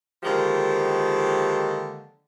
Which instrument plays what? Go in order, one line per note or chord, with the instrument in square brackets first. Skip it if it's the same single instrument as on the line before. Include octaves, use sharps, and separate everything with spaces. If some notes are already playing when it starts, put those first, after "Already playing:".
[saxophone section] D3 D#3 F3 G#3 A#3 G4